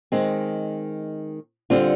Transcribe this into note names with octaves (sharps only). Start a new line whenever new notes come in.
D#3 G#3 C4
D3 G3 C4 F4